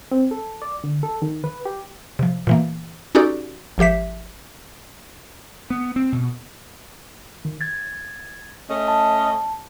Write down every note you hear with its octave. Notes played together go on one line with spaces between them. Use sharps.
C4
A4
D5
D3
A4
D#3
B4
G4
C3 F3
A#2 E3 A#3
C#4 D#4 F#4 G4 A4 D5
G#1 F3 G4 E5 B6
B3
C4
B2
D#3
G#6 A6
A3 C#4 D#5
A5